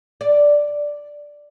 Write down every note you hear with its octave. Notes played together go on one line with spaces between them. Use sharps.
D5